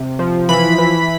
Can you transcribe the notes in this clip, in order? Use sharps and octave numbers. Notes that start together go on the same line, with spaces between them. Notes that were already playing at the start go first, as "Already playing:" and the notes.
Already playing: C3
F3
E3 B5
E3